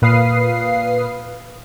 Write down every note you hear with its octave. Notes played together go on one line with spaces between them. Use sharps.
A#2 B4 F5 D#6 C7